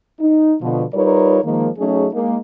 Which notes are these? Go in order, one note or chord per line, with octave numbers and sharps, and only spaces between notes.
D#4
B2 D3 F3
G3 D#4 F4 A#4 B4 C#5
D#3 F3 G#3 A#3
F#3 A3 C#4 D#4 G#4
G#3 A#3 D#4